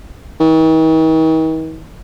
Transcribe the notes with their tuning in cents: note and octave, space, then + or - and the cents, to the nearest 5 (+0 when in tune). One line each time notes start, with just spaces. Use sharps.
D#3 +45